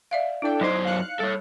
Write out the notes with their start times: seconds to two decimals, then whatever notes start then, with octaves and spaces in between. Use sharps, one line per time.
0.11 D5 E5 F5
0.42 D4 E4 A4 D5 G5
0.61 F#2 D#4 C5 D#5 D6 G#6
0.85 F5 F#6 C#7
1.20 G3 A4 C#5